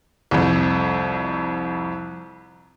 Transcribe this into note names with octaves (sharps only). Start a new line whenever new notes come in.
C2 F2